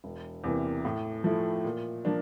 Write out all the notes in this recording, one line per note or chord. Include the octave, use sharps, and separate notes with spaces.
E1
E2 C3 E3 A#3
A2
F3 A3 E4
A#2
F3 A#3 D4